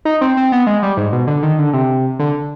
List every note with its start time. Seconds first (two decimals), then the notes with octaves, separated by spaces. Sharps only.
0.05 D#4
0.21 C4
0.37 C4
0.52 B3
0.67 G#3
0.83 G3
0.97 G#2
1.12 B2
1.27 D3
1.43 D#3
1.59 D3
1.73 C3
2.19 D3